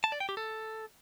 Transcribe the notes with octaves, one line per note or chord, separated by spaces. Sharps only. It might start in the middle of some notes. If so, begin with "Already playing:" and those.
A5
D5
G5
G4
A4